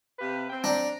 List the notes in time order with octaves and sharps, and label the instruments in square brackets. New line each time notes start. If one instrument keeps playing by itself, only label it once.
[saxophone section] C3 G4 F5 [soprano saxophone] B4
[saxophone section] C4 [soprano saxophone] G5
[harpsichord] D4 [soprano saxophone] A#5